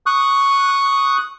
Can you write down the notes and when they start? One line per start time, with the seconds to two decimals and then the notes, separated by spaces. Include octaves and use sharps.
0.06 C#6 D#6 F#6